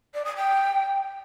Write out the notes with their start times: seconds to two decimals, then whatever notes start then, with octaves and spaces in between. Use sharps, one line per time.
0.14 D5
0.25 D#6
0.36 G5